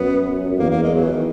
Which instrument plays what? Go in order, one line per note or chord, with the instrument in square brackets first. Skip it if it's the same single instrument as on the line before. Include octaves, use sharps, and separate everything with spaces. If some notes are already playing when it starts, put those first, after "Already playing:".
Already playing: [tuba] F#2 [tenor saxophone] B3
[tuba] E2 [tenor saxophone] A#3
[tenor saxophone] A#3
G#3
F#3
E3
D#3